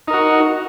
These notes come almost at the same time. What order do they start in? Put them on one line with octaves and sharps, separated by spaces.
D#4 A#4 F#4